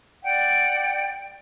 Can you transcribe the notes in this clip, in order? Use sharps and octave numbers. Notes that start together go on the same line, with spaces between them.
D5 F#5 G5